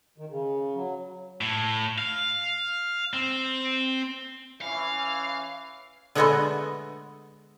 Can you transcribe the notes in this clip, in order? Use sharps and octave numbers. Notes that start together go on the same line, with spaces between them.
D#3
C#3
F#3
A2
F5
C4
E3 C#4 F5
D3 G#3 A3 B3 F#4 D#5